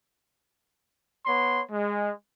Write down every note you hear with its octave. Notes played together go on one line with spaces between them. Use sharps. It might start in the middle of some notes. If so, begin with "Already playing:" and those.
B3 C#5 C6
G#3